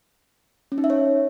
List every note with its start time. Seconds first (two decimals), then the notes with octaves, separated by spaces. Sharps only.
0.72 C#4
0.78 D#4
0.84 E5
0.90 C#5